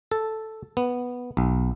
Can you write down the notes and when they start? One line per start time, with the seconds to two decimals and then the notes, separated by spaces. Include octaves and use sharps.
0.11 A4
0.77 B3
1.37 B1